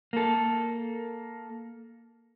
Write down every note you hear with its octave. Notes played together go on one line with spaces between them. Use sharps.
A#3 A4